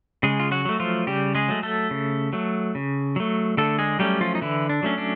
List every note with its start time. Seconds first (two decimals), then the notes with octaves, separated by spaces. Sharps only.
0.23 C#3 G#3 G#4
0.40 F4
0.51 F#3 F#4
0.65 F#3 A3
0.80 F3 F4
1.07 C#3 G3 G4
1.35 G#3 G#4
1.49 F#3 A3
1.63 A3 A4
1.91 C#3
2.33 F#3 A3
2.75 C#3
3.16 F#3 A3
3.57 D3 A3 A4
3.79 G#3 G#4
3.99 F#3 G3 A3 C#4 G4
4.21 F3 F4
4.35 D#4
4.41 D3 E3 E4
4.69 D4
4.83 F#3 A3 C#4
4.98 D4